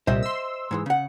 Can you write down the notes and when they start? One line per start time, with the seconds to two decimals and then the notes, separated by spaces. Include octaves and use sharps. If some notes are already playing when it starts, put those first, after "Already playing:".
0.07 C2 A#2 G3 C5 D#5 E5
0.23 C6 E6
0.71 G#2 E3 G#3
0.86 C#3 F#5